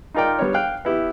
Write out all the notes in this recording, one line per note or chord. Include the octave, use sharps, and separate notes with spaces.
D#4 F4 A#4 D5 G5
G3 B3 D4 C#5
F5 G5 F#6
B3 E4 G4